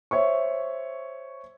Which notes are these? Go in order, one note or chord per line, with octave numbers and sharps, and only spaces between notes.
C5 C#5 E5 C#6